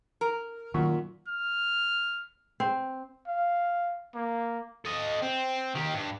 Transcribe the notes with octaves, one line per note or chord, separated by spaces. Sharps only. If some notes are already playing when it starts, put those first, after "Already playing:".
A#4
F#2 A#2 D#3 C#6
F6
C4
F5
A#3
A4 D#5
C4
D#3 G4
G2